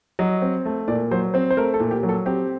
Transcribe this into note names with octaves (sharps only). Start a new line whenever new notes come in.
F#3 D#5
C4
A3
A#2 D5
F#3 C5
C4 C5
C5
A3 A#4
A4
A#2
G4
F#3
A4
C4 G4